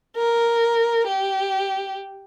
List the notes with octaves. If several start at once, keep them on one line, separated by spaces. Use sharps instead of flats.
A#4
G4